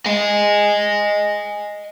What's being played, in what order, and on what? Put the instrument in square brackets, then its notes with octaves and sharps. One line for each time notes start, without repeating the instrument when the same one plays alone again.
[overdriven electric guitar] D#5 G#5